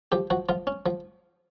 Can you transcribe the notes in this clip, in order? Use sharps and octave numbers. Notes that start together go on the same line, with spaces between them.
F3 G4
F3 F#4
F3 F4
C#4
F3